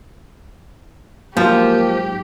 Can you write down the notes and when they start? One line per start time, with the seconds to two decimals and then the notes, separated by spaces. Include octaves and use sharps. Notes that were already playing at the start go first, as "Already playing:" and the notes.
1.37 G#2 F3 F#3 A#3 G4 G#5